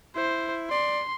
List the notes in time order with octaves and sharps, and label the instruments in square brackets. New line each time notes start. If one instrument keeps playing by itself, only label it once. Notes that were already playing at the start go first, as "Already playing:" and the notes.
[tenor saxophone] E4 [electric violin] C5
[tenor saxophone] D5 [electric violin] C6